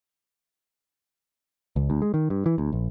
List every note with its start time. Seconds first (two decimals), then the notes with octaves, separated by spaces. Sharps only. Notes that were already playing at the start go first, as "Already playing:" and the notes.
1.76 C#2
1.90 D2
2.02 G#3
2.14 D#3
2.30 G2
2.46 E3
2.58 D2
2.73 A#1